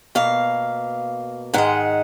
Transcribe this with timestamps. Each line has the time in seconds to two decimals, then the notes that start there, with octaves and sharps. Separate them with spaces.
0.15 B2 A#3 F5
1.54 G#2 D#3 G#3 F#5